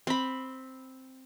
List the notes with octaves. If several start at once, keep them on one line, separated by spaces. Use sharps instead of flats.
C4 B5